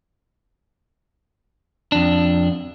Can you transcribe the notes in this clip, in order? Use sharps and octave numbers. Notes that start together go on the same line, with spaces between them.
F2 D4